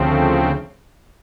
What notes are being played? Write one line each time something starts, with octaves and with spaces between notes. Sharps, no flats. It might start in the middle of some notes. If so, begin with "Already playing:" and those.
Already playing: D2 C#3 F3 A3 C4